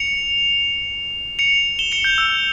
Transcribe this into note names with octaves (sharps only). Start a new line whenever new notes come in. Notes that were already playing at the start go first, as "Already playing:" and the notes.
Already playing: C#7 F7
C#7 F7
E7 G7
C#7 F7
G6
E6